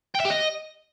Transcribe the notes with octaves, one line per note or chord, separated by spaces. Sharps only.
G5
E5
G4
D#5